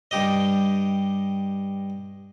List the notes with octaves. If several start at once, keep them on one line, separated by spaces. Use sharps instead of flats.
G2 G4 D#5